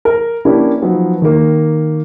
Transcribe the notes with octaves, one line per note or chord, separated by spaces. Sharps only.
A#4
A#3 C#4 D4 E4 G4 B4
F3 F#3 B3 D#4
D#3 A#3